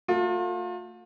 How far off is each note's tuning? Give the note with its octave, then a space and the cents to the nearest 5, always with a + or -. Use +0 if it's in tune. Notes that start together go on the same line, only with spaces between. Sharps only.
A3 +35 F4 +40